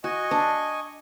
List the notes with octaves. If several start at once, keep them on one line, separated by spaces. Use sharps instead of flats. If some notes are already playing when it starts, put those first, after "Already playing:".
F#4 D#5 G#5 C#6
D4